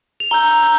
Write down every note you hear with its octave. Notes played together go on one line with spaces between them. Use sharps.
F7
A#5 E6 G6 G7
A#5 E6 G6